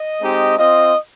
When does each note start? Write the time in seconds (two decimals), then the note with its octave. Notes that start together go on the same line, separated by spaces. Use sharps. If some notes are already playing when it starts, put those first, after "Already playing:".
Already playing: D#5
0.22 G#3 C4 D#4 G4
0.58 C4 F4 D#5